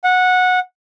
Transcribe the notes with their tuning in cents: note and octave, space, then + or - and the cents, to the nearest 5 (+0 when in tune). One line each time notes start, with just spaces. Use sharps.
F#5 -15